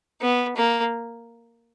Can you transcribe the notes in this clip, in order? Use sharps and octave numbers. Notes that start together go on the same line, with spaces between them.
B3
A#3